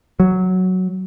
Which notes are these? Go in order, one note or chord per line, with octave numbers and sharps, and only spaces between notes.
F#3